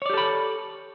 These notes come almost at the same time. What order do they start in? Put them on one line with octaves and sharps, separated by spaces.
C#5 D5 G4 A4 B5